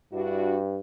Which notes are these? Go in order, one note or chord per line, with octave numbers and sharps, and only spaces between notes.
G2 D4 E4 F#4